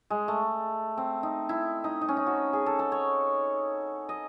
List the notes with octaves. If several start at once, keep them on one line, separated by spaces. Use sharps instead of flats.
G#3
A3
C4
D#4
E4
D#4
D#4
C#4
D#4
F#4
G#4
A4
A4
C#5
D#5